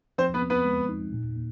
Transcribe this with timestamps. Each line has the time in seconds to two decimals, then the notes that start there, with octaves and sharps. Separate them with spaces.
0.18 F3 C4 C5
0.34 B3 B4
0.42 C4
0.50 B3 B4
0.65 G#3
0.89 D#4
1.13 A#2
1.36 A#3